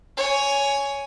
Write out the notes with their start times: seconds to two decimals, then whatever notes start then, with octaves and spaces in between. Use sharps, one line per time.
0.17 C#5 G#5